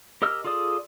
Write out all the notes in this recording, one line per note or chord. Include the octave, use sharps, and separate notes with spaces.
G4 A#4 D#5 E6 F6
F4 G#4 A4 D5 D#6